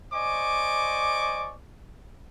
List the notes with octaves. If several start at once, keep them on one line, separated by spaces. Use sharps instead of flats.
C5 D5 D#5 G#5 C#6 D6